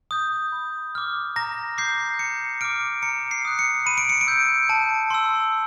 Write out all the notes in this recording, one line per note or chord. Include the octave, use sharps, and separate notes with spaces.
D#6 G6
B5
D6 F6
A#5 A#6
D6 G6 C7
A#5 C#7
D6 F6 D7
A#5 C#7
C7
D#6 F#6
C#7
B5 D#7
D7
C#7
D7
E6 G6
A5
C6 E6